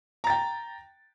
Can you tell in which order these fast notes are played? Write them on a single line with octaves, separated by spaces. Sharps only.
A#5 A6 G5